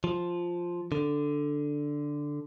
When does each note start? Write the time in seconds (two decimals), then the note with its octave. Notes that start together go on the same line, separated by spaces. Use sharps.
0.04 F3
0.92 D3